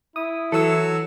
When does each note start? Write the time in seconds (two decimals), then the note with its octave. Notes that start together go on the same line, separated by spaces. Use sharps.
0.16 E4 D#6
0.52 E3 F#3 A4 E6